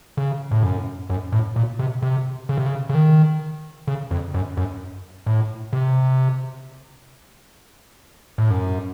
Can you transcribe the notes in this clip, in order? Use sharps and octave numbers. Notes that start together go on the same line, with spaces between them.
C#3
A2
F#2
F#2
A2
A#2
C3
C3
C#3
C3
C#3
C#3
D#3
C#3
F2
F#2
F#2
A2
C3
A2
F#2